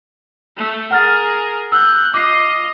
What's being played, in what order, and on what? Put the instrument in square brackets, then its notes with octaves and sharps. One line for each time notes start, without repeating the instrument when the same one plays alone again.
[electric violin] A3
[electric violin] G#4 A#4 [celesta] F#5 F6 A6
[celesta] E6 [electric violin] F#6 G6
[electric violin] F4 D#5 [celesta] D6 C7